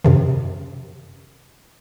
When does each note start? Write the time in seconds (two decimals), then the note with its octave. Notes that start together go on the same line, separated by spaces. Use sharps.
0.05 F#2 C3 D#3